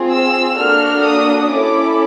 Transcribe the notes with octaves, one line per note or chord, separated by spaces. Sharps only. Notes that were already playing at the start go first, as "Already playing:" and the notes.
Already playing: C4 F4 G#4
E6
A#3 D4 F#4 A4 F6
D#6
C#4 E4 A4 D6